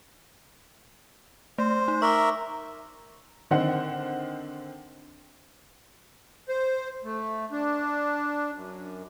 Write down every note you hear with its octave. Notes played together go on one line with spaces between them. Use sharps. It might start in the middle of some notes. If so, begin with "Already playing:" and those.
A3 C5
D#4
A#4 E5 C#6 D6
D3 D#3 C4 F#5
C5
A3
D4
F#2